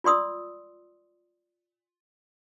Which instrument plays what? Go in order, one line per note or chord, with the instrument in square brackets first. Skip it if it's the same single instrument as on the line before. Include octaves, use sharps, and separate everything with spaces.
[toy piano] F4 D5 C6 D#6 E6